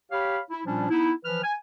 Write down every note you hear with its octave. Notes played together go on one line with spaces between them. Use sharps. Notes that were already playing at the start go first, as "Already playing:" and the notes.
G4 C#5 F5 B5
E4
A#2 F3 G3 C#4 D4
B3 D#4 E4
E3 F3 B4 F6
G#5